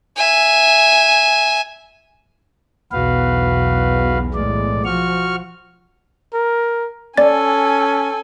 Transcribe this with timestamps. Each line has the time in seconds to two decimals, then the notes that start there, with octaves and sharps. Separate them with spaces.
0.16 E5 G#5
2.92 B1 E2 F#4 B4 F5
4.34 A2 G#3 D5
4.85 F3 F#4 C#6 F6
6.33 A#4
7.17 C#4 A4 D5 G#5 A6